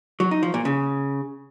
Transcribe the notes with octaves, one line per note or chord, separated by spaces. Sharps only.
F#3
D#4
F3
A#2
C#3